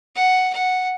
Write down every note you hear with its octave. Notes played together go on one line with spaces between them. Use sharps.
F#5
F#5